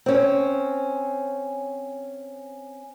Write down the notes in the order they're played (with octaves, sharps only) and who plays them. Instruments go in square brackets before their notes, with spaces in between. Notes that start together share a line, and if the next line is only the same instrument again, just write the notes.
[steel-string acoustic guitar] C4 C#4